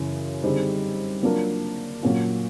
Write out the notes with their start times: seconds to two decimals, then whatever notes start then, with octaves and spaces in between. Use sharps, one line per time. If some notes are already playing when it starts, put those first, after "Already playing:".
Already playing: F#2 C#3 E3
0.43 D3 G3 C4 D#4 G#4
1.23 F#3 A#3 D4 F4 A#4
2.03 A#2 F#3 A#3 C#4 F4